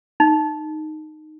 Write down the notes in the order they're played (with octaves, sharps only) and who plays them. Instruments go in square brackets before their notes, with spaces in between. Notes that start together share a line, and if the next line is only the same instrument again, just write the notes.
[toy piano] D#4